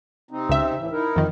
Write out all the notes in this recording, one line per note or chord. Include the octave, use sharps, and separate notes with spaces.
C3 C4 D#4
C#2 E5
A2 E3
D#4 E4 A#4
F2 D#3